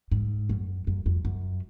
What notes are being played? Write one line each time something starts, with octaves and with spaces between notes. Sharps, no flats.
G#2
F#2
F#2
F2
F#2